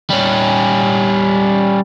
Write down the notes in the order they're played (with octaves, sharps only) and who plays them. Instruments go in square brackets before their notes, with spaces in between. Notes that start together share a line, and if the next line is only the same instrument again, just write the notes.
[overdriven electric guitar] G3 C#4